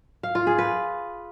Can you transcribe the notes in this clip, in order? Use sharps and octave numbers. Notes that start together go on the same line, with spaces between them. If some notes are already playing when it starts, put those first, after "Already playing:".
F5
F4
G#4
B4